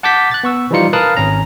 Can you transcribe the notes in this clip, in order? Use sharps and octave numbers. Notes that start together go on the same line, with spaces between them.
F#5 A5 D6 G6 B6
F#6 A6
B3 C#6 E6
E3 F3 G3 D#4 F4 C#7
A#4 B4 F5 A5 D#6 F#6
G#1 C#4 A#5